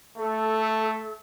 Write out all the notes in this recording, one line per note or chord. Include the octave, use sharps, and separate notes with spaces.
A3 A4